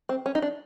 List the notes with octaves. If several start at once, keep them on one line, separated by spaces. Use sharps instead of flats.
C4
C#4
D#4
D4